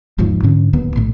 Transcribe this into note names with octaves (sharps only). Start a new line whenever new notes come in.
E1 D#2 G#2 F3
G#2 D3 C#4
D1 D#2 B3
A#1 A2